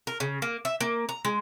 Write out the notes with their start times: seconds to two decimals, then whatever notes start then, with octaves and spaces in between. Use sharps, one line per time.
0.07 A#4
0.20 C#3
0.42 A#3
0.65 E5
0.80 A#3
1.09 A#5
1.25 G#3